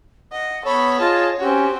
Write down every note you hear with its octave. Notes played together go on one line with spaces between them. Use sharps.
D#5 F#5
B3 A4 C#5 B5 C#6
F4 G#4 D#5 A5
C4 C#4 F#4 G4